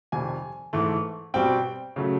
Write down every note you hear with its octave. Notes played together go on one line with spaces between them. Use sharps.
F2 C3 D#3 G3 G#5
G#2 E3 A3
B2 G3 C4 G5
C#3 F#3 A3